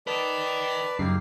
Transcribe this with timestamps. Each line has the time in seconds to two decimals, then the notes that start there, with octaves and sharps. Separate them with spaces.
0.07 A#4 B4 D5 D#5 A5
0.99 F#2 C#3 A#3 D#4 G4 C7